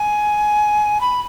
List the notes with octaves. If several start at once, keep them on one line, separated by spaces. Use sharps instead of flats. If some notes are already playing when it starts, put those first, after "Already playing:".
Already playing: G#5
B5